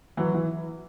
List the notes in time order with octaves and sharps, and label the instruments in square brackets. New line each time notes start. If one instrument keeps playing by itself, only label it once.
[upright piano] E3 [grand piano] F#3
[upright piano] E3 [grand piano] E4